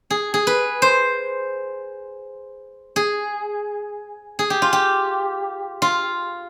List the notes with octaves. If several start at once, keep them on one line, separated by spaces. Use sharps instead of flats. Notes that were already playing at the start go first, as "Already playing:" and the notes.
G#4
G#4
B4
C5
G#4
G#4
G4
F4
G4
F4